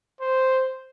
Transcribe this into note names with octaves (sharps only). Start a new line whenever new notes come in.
C5